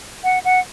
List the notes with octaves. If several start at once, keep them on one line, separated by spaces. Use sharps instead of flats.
F#5
F#5